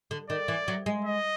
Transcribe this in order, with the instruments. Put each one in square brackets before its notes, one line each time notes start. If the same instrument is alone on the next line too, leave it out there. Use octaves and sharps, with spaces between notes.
[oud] D3
[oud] D#3 [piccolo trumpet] D5
[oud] E3
F#3
G#3
[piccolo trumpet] D#5